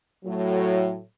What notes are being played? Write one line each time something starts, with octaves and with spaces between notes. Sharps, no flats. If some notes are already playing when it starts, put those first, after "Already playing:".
A2 F#3